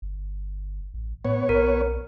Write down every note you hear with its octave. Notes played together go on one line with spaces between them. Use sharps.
G1
A1
A2 B3 C#5
B1 A#4